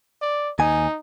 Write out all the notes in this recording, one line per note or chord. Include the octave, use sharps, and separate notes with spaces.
D5
D#2 D#4 G#5